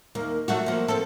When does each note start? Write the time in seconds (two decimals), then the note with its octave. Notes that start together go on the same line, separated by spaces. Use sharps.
0.15 D#2 A#3
0.48 F#3 A3 F#4
0.66 F3 A#3
0.88 C4 A4